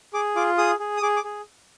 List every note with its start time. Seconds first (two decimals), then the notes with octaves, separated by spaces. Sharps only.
0.13 G#4 D6
0.36 F4 D6
0.58 G#4 D#6
0.79 G#4
0.97 D#6
1.02 G#4 D6
1.17 D6
1.24 G#4